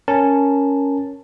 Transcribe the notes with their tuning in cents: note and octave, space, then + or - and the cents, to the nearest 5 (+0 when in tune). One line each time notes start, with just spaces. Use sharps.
C#4 +0 A#4 +0 A5 +0